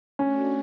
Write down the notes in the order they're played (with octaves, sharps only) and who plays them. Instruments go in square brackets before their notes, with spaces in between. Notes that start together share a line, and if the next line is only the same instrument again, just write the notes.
[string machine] A3 D4 F#4 [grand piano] C#4